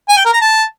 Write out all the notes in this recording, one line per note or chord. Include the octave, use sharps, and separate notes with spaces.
G#5
G5
A#4
A#5
A5